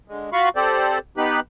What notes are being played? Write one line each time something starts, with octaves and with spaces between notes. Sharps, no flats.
D3 G#3
F4 F#4 F5 B5 C#6
C4 G4 A4 C5 D5
B3 D#4 G4 B4 B5